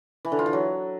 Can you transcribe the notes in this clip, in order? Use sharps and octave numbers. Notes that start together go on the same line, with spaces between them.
E3
D3
F4
E3
F#3